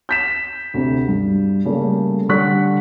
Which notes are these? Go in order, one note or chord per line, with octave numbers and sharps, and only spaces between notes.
G6 B6 E7
D2 C3
G2
C#3 G3 A3 A#3
D3 G3 C#6 F#6 B6